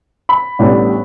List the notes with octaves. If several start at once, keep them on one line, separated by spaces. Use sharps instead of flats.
B5
A1 A2 G3 B3 D4